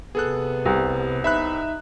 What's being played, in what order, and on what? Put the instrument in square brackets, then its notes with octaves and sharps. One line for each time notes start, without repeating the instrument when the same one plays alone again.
[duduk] C3 [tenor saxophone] B3 [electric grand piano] G#4 A4 F#6
[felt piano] C2
[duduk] D#4 [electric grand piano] E5 B5 F#6